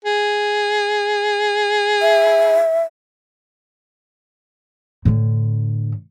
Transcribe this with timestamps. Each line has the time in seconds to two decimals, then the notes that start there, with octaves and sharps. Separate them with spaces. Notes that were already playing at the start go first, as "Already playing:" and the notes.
0.05 G#4
2.01 E5
5.05 A2 D3